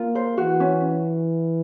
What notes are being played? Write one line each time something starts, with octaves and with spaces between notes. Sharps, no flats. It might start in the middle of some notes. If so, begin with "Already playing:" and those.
Already playing: A#3 F4
C5
E3 F#4
C#4